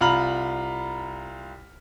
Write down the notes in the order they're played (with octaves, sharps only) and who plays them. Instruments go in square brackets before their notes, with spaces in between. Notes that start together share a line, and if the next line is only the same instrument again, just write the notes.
[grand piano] C2 F4 A#5 B5 F6 F#7